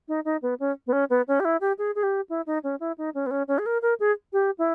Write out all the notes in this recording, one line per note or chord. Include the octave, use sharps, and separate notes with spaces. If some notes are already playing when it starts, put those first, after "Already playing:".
D#4
D#4
B3
C#4
B3
C#4
B3
C#4
G4
E4
G4
G#4
G#4
G4
E4
D#4
C#4
E4
D#4
C#4
B3
C#4
C#4
G#4
A#4
A#4
G#4
G4
E4